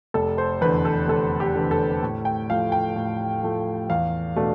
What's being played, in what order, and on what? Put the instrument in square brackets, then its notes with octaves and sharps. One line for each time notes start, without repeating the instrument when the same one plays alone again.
[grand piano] F1 A4
C5
E2 D3 B4
A4
F1 A4
G4
E2 D3
A4
A2
G5
F3 A3 F5
G5
A2
F3 A3
E2 F5
B2 A3 D4